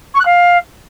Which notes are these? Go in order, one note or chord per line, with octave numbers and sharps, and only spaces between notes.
C#6
F#6
F5